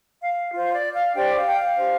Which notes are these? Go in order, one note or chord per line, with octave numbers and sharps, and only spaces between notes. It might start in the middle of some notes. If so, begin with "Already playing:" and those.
F5
F4 C5
D5
F5
D4 G4 C5 D5 G5
F5
G5
F5
D4 G4 C5